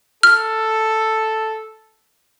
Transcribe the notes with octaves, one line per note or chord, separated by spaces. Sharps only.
A4 F6